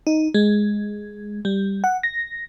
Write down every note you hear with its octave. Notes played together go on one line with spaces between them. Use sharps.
D#4
G#3
G3
F#5
A#6